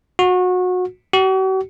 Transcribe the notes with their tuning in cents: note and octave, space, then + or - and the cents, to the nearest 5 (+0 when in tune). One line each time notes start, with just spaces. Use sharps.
F#4 -25
F#4 +45